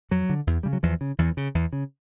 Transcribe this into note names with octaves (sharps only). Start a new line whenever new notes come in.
F2 F#3
D3
E2
C#3 G3
F#3
E2 F3
C#3
E2 E3
C#3
E2
C#3